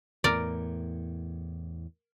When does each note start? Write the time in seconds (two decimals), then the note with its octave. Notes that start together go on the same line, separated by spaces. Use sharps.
0.24 E2 A2 A#4 D5